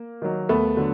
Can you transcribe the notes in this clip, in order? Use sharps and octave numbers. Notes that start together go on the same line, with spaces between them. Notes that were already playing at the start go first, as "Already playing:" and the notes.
Already playing: A#3
D#3 F#3
D#2 A3 B3
D3 F#3